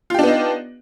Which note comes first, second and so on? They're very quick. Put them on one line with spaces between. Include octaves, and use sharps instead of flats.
F4 G4 D4 B3 D#4